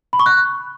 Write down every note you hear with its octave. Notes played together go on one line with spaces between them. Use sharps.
B5
C#6
F#6